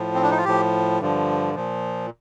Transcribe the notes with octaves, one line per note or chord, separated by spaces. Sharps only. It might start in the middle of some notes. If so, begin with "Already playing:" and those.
Already playing: A2 F3
C4
D4
D#4
F4
A2 F3 G4
G2 D3 F3
A#2 F3